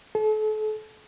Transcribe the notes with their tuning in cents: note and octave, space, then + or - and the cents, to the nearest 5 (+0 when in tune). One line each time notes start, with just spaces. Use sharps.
A4 -35